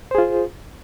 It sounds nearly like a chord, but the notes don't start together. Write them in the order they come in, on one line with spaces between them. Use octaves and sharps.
C5 G#4 F4